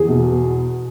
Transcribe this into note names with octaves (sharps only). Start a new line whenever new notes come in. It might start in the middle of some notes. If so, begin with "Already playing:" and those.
Already playing: E2 G#4
B2